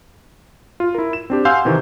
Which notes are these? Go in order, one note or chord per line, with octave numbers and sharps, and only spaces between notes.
F4
E4 A#4
E7
C4 D4 G4
F5 F#5 G#5 C6 E6 G6
C3 D#3 E3 C4